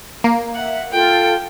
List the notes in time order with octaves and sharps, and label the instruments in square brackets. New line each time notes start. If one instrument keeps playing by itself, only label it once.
[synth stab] A#3
[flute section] E5 [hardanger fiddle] F#5
[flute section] F4 A4 [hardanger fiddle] G5